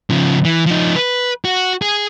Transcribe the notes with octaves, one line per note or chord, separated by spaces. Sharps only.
C#3 F3
E3
F3 D#4
B4
F#4
G#4